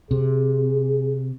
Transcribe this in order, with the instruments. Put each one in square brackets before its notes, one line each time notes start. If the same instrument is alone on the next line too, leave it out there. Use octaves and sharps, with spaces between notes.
[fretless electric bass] C3 [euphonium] G#4